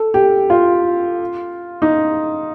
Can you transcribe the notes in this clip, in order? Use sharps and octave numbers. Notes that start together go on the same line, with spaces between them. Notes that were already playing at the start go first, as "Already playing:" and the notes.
Already playing: A4
G4
F4
D#4